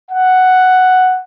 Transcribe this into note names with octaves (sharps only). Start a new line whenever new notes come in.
F#5